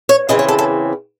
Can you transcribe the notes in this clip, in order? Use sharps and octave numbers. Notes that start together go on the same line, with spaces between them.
C#5
E2 C#3 E3 C4 D#5
C#5
A4
A4